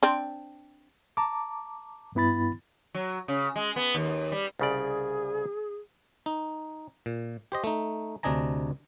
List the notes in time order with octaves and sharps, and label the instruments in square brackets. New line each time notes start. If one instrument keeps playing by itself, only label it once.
[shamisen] C4 D4
[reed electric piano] A5 A#5 D6
G2 B3 E4 B5 A6
[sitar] F#3
C#3
G#3
B3
D#2
G3
[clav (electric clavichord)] C2 C#3 D5 [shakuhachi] G#4
[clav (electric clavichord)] D#4
A#2
G4 C5 D#5
A3 D#4
D2 C3 D4 D#5 G#5 A#5